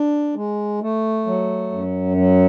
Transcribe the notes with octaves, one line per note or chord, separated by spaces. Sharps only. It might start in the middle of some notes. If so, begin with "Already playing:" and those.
Already playing: D4
G#3
A3
F#3
F#2
F#3